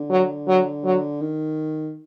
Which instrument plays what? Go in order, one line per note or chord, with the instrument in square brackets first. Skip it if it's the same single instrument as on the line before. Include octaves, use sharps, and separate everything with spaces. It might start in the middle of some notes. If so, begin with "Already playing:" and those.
Already playing: [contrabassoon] D3
[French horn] F#3
F#3
F#3
[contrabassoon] D#3